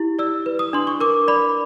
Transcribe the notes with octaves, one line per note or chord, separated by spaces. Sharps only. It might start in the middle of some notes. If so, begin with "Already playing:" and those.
Already playing: E4 G4
D5 E6
B4
D#6
D4 C6
C#6
A#4 D6
D5 B5